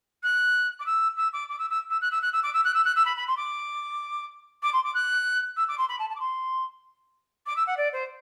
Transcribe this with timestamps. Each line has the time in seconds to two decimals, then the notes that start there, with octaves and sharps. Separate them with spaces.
0.23 F#6
0.79 D6
0.86 E6
1.17 E6
1.33 D6
1.49 D6
1.58 E6
1.70 E6
1.90 E6
2.01 F#6
2.11 E6
2.22 F#6
2.32 E6
2.43 D6
2.53 E6
2.64 F#6
2.74 E6
2.85 F#6
2.95 E6
3.05 B5
3.17 B5
3.27 C6
3.37 D6
4.62 D6
4.73 C6
4.84 D6
4.94 F#6
5.56 E6
5.68 D6
5.78 C6
5.88 B5
5.99 A5
6.09 A5
6.15 D6
6.19 C6
7.46 D6
7.56 E6
7.67 F#5
7.77 D5
7.92 C5